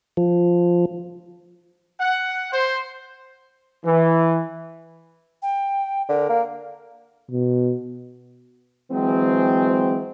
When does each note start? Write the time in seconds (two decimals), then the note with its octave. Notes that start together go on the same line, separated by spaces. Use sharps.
0.17 F3
2.01 F#5
2.53 C5
3.85 E3
5.42 G5
6.09 D3 A#4
6.29 A#3
7.31 B2
8.91 E3 F#3 G#3 C4